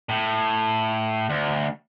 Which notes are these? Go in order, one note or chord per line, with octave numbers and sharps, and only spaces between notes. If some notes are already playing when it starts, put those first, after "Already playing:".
A2
D2